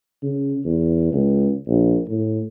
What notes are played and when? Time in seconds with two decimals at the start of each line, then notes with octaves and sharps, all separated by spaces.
0.23 C#3
0.65 E2
1.13 C#2
1.68 A#1
2.08 A2